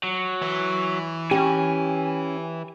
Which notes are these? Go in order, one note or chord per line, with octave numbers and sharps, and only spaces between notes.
F#3
E3
C#4 G4 G#5